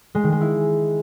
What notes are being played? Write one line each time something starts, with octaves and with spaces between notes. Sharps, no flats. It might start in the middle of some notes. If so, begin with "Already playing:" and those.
G#3
D#3
G#3
E4